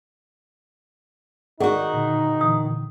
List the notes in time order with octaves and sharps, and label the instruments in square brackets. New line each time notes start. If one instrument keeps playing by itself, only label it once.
[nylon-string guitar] D#3 F#4 [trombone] D#4 [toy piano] G#4 F#5 C#6 [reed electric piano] D5
[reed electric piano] A#2 D3
[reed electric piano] A#2 D3 E3 [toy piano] D#6